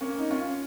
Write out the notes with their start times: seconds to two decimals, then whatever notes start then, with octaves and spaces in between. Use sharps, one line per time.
0.01 A#3 C#4
0.18 D#4
0.31 C#4 F4